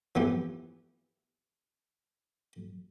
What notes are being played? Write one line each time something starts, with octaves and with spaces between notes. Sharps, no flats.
E3 F3 B3 G4